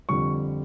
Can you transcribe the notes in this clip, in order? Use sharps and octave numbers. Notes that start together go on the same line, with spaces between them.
F2 D3 G3 C#6